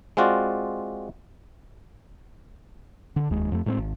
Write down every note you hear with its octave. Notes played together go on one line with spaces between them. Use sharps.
G#3 C4 F4 F#4 D5
D3 D4
F1 D#2 G#3
F2 A3
A2 G#3 A#3 C4
G#1